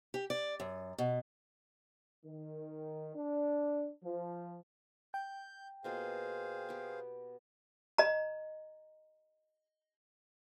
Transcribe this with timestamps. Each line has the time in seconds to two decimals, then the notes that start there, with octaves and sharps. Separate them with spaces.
0.14 G4
0.30 D5
0.60 F#2
0.98 B2
2.26 D#3
3.15 D4
4.03 F3
5.14 G5 G6
5.84 B2 A#3 F4 G#4 C5 F5
6.69 B3 G4
7.98 D#5 A#5